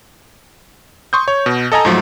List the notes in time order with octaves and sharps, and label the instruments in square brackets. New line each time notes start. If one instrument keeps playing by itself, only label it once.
[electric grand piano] C6 C#6 D#6 G6
C#5
B2
A4 D#5 G#5 A#5
G#2 F3 F#3 A3